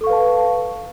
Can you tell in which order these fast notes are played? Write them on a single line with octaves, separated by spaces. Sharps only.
A4 C#6 F5 B4 A5